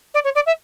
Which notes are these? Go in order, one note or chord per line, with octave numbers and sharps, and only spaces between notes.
D5
C#5
D5
E5